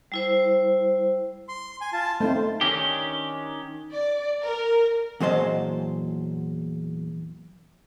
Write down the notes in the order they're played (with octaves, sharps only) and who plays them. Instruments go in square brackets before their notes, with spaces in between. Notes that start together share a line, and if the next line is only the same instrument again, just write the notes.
[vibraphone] G3 E4 C5
[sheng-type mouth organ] C6
G#5
F4 A5
[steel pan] A3 C4 D#4 [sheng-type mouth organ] C5
[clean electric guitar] D#3 C#4 D4 G4
[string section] D5
A#4
[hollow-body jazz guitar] E2 A#2 F#3 C5 D#5 A5